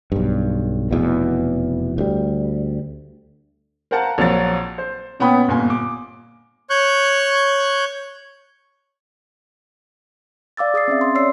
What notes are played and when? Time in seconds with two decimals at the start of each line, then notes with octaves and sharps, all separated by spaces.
0.12 B1 G2
0.91 F1 E2 B2
1.98 D2 G3
3.91 A#4 C5 F5 F#5 A5 A#5
4.18 A#1 F3 F#3 A6
4.78 C5
5.20 A#2 B3 C#4 G5 B5 D#6
5.48 G1 A#2 G#5
5.70 D6
6.70 C#5 C#6 F#6 G6
10.57 D5 F5 D6 E6 A6
10.74 G#4 D#6 A6 C7
10.88 C4 C#4 E5
11.01 C6
11.15 C#5 D5 C6 E6 C7